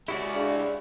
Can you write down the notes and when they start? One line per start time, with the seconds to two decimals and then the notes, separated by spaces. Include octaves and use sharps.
0.08 G#3 C#4 E4 F#4 G4 A#4 D5 G#5
0.35 D4 G#4 F5